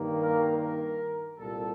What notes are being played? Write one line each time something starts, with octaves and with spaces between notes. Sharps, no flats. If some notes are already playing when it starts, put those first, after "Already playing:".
Already playing: G2 D#3 A#3
A#4
A#4
C2 A#2 G3 A#3 A4